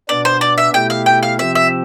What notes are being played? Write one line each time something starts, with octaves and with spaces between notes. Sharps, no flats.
B2 B3 D4 D5
C5
D5
E5
B2 A3 E4 G4 G5
F5
G5
F5
C3 F3 C4 G4 E5
E5